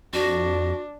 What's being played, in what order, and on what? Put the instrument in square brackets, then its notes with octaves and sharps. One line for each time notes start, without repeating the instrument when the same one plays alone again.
[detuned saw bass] F2 [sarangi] D4 [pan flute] F#4